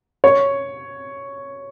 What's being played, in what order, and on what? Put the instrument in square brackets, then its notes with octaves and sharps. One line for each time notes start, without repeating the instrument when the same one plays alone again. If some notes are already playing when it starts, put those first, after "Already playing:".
[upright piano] C#5